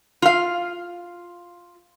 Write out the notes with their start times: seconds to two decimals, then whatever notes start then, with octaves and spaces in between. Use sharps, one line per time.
0.22 F4 F5